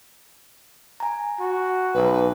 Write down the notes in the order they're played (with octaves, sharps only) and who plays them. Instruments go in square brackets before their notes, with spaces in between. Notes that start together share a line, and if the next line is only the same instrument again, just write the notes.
[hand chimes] G#5 A#5
[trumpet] F#4
[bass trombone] B1 [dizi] B4